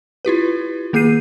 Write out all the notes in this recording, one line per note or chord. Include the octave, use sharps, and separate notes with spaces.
E4 F4 G4 B4
D#3 A#3 G#4 G6 C7 D#7